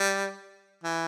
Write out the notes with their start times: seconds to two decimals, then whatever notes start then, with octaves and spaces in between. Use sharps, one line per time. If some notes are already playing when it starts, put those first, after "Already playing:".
Already playing: G3
0.83 E3